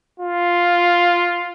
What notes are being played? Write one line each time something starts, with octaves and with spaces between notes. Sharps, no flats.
F4